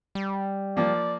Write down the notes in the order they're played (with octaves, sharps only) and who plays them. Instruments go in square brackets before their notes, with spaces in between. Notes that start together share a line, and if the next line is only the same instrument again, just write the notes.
[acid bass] G3
[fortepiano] F3 A#3 [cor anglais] D5